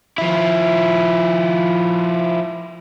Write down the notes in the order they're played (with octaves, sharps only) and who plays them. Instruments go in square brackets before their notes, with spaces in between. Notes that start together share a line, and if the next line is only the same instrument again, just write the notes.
[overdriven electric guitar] F3 E4